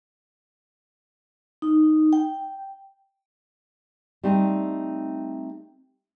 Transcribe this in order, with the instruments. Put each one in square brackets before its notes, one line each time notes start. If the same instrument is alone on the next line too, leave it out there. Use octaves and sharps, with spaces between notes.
[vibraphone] D#4
G5
[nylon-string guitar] G3 A3 C4 D#4